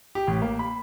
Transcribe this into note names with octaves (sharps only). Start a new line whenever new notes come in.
G4
A1
A#3
B5